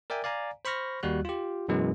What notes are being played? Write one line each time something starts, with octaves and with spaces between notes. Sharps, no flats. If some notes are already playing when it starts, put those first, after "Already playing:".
A#4 D5 E5 G5 G#5
D5 F5 G#5 A#5
C5 B5 C#6 F6 A#6
D#2 G3 F#4 F#6
F4 G4
F#2 B2 E3 G#3